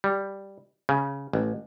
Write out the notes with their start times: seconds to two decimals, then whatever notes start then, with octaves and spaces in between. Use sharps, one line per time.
0.04 G3
0.89 C#3
1.33 A1